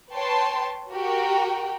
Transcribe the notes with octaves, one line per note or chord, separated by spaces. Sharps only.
B4 C#5 G5 A5 C6
F#4 G4 A#4 G5